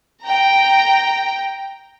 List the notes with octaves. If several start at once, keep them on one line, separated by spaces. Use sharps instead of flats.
G5 A#5